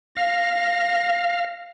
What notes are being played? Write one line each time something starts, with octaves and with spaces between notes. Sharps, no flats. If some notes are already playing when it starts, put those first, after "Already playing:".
F5 A#6